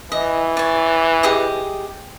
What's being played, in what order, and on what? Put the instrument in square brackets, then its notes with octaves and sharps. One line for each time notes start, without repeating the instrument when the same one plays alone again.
[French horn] E3 [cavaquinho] D#5
[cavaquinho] C#5 D5
G4 G#4 D#5